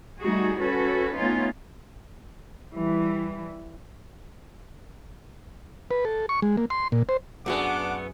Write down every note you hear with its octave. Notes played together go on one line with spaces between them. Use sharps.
G3 A3 D#4 F#4 G#4
C#4 F#4 A4 B4
A3 B3 C#4 D#4 F4
E3 G3
B4
A4
C#6
G#3
A#3
C6
A#2
C5
F#2 A3 B3 D4 F#4 G#4 F#5 D6